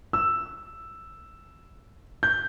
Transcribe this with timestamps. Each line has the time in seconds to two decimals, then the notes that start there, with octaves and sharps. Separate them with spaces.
0.13 E6
2.23 G6